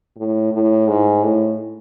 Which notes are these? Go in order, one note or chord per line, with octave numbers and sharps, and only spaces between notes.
A2
A2
G#2
A2